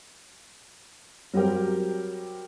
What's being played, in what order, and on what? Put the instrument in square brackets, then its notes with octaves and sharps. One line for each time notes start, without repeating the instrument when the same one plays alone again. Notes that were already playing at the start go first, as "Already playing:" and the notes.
[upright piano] F#3 G3 C4 G4 A#4